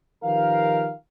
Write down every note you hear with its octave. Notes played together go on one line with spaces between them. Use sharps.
D#3 F3 G4 A#4 B4 F5